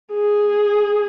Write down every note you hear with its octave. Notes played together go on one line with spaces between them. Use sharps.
G#4